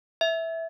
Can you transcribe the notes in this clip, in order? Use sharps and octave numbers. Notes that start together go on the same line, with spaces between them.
E5